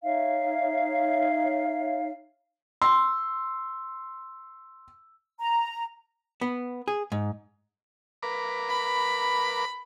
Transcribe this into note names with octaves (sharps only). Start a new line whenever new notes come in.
D#4 C#5 E5 F5
C6 E6
A#5
B3
G#4
G#2
A#4 B4 D6
B5